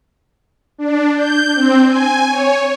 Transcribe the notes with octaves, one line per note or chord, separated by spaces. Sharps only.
D4
G6
C4
G#5
C#5